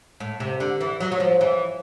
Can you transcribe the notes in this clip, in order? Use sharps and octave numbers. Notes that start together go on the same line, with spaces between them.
A2
C3
D3
E3
F#3
F#3
F3
E3